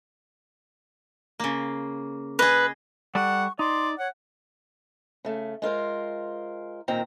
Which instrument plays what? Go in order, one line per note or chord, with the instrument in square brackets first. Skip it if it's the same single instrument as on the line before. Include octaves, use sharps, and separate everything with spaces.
[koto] C#3 A#3
[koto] G#4 D#5 [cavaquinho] B4
[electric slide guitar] G3 A4 D5 [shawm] F#5 [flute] C#6
[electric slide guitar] D#4 [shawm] D5 [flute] C6
[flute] C#5 [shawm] F#5
[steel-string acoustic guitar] C#3 A3
G#3 F4 A#4 C5
A#2 D#3 C4 A#5